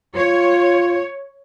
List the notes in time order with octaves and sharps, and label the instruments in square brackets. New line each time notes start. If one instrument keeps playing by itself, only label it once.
[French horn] F4 [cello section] C#5